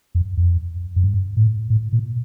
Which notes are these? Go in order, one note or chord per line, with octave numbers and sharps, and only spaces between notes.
F2
F2
F#2
G2
A2
A2
A#2